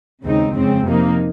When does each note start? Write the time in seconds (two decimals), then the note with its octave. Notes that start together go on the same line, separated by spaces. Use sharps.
0.24 D#2 C#3 G#3 C4 D#4
0.55 F2 C#3 F3 G#3 C4
0.86 C3 F3 A#3 D#4